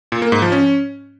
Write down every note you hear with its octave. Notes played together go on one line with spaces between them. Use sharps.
A#2
A#3
G#2
F3
C#4